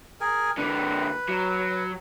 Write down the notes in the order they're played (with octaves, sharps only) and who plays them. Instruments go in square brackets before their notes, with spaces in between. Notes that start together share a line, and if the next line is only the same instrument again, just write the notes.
[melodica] G#4 A#4 G#5
[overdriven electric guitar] D3 A#3 [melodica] B4
[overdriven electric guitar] F#3